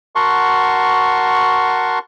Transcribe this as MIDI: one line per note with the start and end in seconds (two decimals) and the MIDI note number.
0.15 1.99 66
0.15 1.99 70
0.15 1.99 78
0.15 1.99 81
0.15 1.99 84
0.15 1.99 85